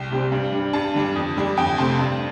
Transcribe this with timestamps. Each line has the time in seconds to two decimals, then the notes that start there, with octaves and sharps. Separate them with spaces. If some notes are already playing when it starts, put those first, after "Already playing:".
Already playing: C2 G5
0.11 C3 G3 C4
0.32 G2
0.52 G3 D4
0.73 G2 A5
0.94 D3 G3 D4
1.16 F2
1.37 D3 G3 D4
1.57 F2 G5
1.78 C3 A3 C4 A5
1.99 G2